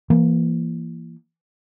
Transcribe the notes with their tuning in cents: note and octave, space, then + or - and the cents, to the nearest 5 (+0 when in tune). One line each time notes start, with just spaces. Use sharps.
E3 +30 A#3 +5